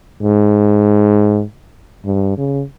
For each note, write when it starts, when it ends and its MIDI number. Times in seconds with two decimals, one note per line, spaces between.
0.23 1.43 44
2.05 2.34 43
2.38 2.63 49